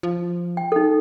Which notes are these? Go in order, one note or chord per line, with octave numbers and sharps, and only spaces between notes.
F3
G5
D#4 A4